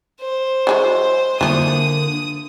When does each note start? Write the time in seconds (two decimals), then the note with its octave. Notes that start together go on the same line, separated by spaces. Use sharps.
0.21 C5
0.67 F#3 G#3 E4
1.41 D3 E3 F3 A#3 D#6